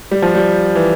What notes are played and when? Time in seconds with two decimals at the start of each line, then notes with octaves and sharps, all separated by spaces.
0.11 G3
0.22 F3
0.35 G3
0.75 E3